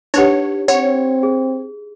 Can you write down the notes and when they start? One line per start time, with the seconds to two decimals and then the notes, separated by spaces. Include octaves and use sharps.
0.14 D4 D#4 G4 B4 C#5 F#5
0.68 C4 C#5 F#5
1.23 G#4